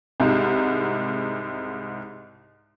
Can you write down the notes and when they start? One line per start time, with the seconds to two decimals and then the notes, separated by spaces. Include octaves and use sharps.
0.20 C2 G#2